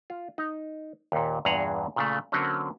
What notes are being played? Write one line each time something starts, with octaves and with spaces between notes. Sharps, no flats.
F4
D#4
D#2 A#2
E2 G2 A#2 G#4 F#5 A#5
A#2 C#3 A3
D3 F#3 A#3 C4 C#4